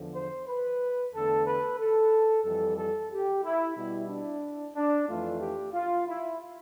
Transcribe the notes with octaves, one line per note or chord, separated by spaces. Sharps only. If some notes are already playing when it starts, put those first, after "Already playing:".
Already playing: E2 D3 F3
C5
B4
E2 D3 A3 A4
B4
A4
F2 E3 G3 A4
A4
G4
E4
B2 G3 E4
D4
D4
F2 E3 A3 F4
G4
F4
E4